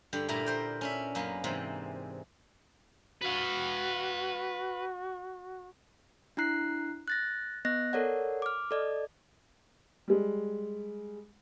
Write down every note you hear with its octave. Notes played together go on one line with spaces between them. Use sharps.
G2 D3 G4
A#2 D3 A3 E4 A#4 A#5
A#4 C5 G5
C#4 D4 E5
F#2 A#3 B3
G#2 C3 E3 C4
F#4 B4 F5
D4 E4 A#5 F#6 C7
F#6 A6 A#6
B3 D#5 F#6 A#6
A4 A#4 C#5 D5 F#5
D6 F6
A4 D5 D#5
G3 G#3